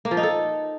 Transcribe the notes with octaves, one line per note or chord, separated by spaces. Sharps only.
A#3
F3
D#4
A4